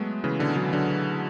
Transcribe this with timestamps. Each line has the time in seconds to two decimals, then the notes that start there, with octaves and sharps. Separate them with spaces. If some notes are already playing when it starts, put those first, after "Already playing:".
Already playing: F#3 G#3 A3 B3
0.24 C#3 E3
0.39 B2 D3
0.56 D3 F#3
0.72 D3 F#3